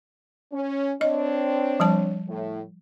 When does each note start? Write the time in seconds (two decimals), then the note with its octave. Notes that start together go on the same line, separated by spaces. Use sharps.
0.53 C#4
1.01 C4 D4 C#5 D#5
1.80 F3 G3 A5
2.29 A2